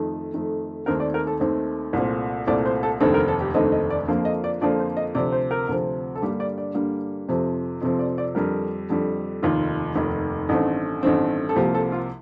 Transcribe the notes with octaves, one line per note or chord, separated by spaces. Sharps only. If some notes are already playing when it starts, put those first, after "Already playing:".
Already playing: F2 D#3 A3
F2 D#3 A3
D#2 D#3 A3 C4 A#4
D5
A#4
A4
D#2 D#3 A3 C4
C2 A#2 A3 C4
C2 A#2 A3 C4 D5
C5
A4
F1 D#2 D3 A3 C4 A4
A#4
A4
G4
F1 D#2 D3 A3 C4 D#5
D#5
D5
F2 D3 F3 A#3
D#5
D5
F2 D3 F3 A#3 D5
C5
D#5
D2 C3 F3 C4 D5
C5
A#4
D2 C3 F3 C4
A4
G2 D3 G3 A#3 G4
D5
D5
G2 D3 G3 A#3
F2 C3 F3 C4
F2 C3 F3 C4
D5
D5
F2 D3 G3 A#4
F2 D3 G3
F1 D#2 D#3 F4
F1 D#2 D#3
A1 G2 D#3 A3 C4
A1 G2 D#3 A3 C4
A4
C2 C3 F3 A#3 G4
A4
F4